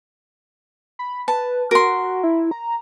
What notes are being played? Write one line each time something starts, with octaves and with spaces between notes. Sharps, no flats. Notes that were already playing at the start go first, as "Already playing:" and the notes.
B5
B4 A5
F#4 A#4 C6
E4
A#5